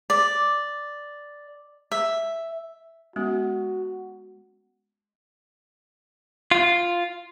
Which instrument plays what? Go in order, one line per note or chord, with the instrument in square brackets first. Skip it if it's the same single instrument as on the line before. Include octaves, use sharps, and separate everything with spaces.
[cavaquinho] D5
E5
[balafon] G#3 B3 C#4 [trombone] F#4
[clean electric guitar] F4